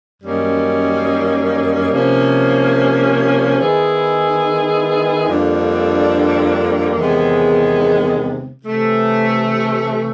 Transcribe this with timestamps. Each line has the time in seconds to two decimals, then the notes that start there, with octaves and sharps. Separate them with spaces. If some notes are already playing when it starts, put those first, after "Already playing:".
0.23 F#2 D#3 G3 A#3 C#4
1.92 C3 F3 A#3 C#4
3.59 D#3 G#3 B3 E4 G#4
5.28 F2 D3 G3 A#3 D4
6.96 E2 C3 D#3 G#3 B3
8.64 C3 E3 A3